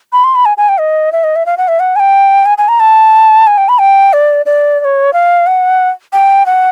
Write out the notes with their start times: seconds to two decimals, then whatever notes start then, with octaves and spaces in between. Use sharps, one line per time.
0.13 B5
0.24 C6
0.35 B5
0.45 G#5
0.57 G#5
0.69 G5
0.79 D#5
1.12 E5
1.24 D#5
1.36 E5
1.46 F5
1.58 F#5
1.68 E5
1.80 F#5
1.96 G#5
2.00 G5
2.46 G#5
2.58 G#5
2.68 A#5
2.80 A5
3.47 G#5
3.58 G5
3.69 B5
3.80 G5
4.13 D5
4.46 D5
4.80 D5
4.85 C#5
5.13 F5
5.47 F#5
6.13 G5
6.46 F#5